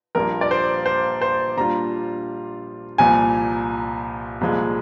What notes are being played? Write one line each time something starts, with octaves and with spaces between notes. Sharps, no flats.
A#1 A#2 G3 A#3 F4 A#4
D5
C5
C5
C5
A#2 G3 D4 F4 A#5
C2 A#2 F3 G#5
C2 A#2 F3 G#3